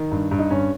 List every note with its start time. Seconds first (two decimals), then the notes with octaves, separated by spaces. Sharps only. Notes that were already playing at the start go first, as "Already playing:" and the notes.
Already playing: D#3
0.11 G2
0.31 G2
0.39 D#4
0.51 G2 C#4